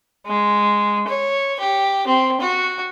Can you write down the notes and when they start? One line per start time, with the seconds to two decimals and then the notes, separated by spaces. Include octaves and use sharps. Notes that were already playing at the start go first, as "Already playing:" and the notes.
0.26 G#3
1.07 C#5
1.59 G4
2.07 C4
2.40 F#4